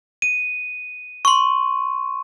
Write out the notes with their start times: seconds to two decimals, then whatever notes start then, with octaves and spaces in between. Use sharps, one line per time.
0.22 D#7
1.25 C6 C#6